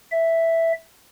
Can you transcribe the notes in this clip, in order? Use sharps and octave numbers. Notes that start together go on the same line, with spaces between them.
E5